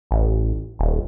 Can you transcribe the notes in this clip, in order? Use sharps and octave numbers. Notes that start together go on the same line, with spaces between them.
A1
D#1